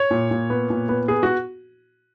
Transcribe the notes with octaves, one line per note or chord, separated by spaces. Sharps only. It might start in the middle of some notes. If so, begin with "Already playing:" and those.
Already playing: C#5
A#2
A#2
B3
A#2
B3
B3 G#4
F#4